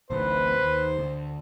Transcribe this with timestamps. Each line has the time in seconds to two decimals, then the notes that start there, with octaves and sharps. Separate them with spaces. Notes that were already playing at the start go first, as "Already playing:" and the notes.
0.10 A1 D2 A2 B4 C5
0.62 D#2
0.99 D2